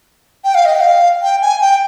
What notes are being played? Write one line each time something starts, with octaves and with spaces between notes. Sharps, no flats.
G5
F5
D#5
G5
F5
G5
G#5
G5